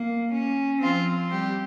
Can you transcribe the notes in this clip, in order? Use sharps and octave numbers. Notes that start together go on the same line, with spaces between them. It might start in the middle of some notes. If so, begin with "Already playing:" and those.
Already playing: A#3
C#4
F3 C4 F4
G3 G4